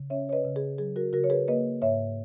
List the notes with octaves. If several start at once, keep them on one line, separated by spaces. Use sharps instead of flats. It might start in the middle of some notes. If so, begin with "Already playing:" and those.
Already playing: C#3
C#4 C#5 E5
C#5
B4 D#5
C#3
G#4
F#3 G#4
F#4 A#4
C#3 F#4 A#4
C#5
G#4 B4
A#3 B4 D#5
G#2 C#5 E5